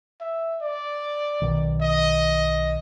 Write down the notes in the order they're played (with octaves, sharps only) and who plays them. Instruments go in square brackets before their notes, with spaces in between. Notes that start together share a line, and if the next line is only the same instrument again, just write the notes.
[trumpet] E5
D5
[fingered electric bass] B1 B2 D#3
[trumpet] D#5